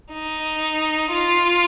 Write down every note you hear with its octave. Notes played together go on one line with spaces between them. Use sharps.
D#4
F4